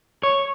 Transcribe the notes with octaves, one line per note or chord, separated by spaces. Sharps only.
C#5